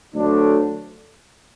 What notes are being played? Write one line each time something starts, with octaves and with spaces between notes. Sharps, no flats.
D2 D3 F#3 A3 D4